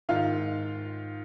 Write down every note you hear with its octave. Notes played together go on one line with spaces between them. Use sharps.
G#2 D#3 F4 F5